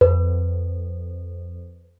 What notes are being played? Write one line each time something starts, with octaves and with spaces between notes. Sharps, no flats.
F2 B4